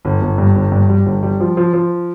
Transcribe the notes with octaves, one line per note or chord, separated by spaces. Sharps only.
G1
G1
G2
G1
G2
G3
G1
G3
F3
F3
F3